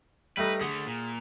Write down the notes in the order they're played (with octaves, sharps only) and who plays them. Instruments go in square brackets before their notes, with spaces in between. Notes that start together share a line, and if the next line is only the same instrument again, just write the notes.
[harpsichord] G3 A3 D#4 [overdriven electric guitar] B4
[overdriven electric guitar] D3 A3 [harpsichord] G#4 F#5
[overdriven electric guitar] A#2